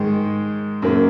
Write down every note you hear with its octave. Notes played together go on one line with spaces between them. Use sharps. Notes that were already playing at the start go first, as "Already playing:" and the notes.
Already playing: G#2 D#3 G#3
F#2 C#3 A#3